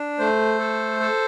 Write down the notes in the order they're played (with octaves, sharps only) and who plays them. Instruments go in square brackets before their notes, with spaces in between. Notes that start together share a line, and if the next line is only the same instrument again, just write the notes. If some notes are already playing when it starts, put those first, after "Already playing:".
Already playing: [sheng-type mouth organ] D4
A3 C5
A4
A4